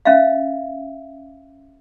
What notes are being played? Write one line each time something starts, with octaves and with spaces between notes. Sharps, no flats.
C#4 E5 F5